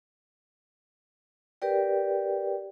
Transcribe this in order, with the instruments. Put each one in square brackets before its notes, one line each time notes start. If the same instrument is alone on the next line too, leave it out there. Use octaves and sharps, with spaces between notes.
[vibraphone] G4 A#4 B4 D5 G5